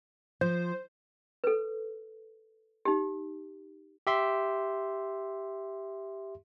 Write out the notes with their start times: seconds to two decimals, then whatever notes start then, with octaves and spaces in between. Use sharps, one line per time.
0.41 F3 C5
1.44 A4 B4
2.85 D#4 G4
4.07 G4 E5 C6